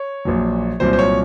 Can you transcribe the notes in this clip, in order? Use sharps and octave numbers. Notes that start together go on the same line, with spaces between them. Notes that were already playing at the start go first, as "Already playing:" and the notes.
Already playing: C#5
A#1 A#2 F#3
C2 A#2 F#3 C5
C5
C#5